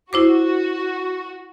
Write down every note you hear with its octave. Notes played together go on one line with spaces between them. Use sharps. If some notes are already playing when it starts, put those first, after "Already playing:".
E4 F#4 C5 D6